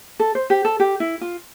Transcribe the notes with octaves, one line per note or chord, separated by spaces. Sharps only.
A4
C5
G4
A4
G4
E4
F4